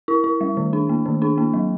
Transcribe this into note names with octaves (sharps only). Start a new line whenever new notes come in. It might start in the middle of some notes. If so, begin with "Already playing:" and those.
E4
E4
G3
D#3
D4
A#3
D#3
D4
A#3
F#3